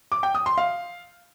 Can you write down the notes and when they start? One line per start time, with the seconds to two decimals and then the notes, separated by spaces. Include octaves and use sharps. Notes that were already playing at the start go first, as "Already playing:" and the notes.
0.12 D6
0.23 G5
0.35 D#6
0.46 C6
0.57 F5